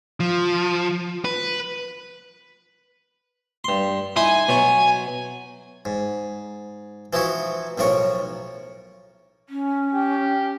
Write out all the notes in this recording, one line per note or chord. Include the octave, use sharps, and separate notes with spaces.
F3
B4
G2 C6
D#4 E4 G#5 C6
B2 F#3 C#6
G#2
E3 F3 D#4 E4 F#4
B1 A2 F3 A#4 C#6
C#4
G4